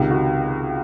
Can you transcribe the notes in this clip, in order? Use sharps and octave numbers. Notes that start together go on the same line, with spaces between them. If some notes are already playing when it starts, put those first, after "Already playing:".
Already playing: C#2 C3 D#3
F#4